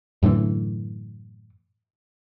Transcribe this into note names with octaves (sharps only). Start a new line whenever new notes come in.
F#2 A2 D3 E3